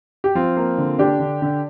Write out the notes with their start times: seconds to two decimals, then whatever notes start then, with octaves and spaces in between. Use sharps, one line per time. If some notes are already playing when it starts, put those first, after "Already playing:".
0.24 G4
0.35 F3 C4 F4
0.57 A#3
0.78 D3
0.98 D3 D4 G4
1.19 D3
1.42 D3